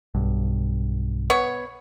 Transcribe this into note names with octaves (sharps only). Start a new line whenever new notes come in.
B1 G2
B3 C#5